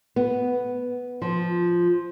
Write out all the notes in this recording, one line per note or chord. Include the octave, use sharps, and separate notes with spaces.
B3
F3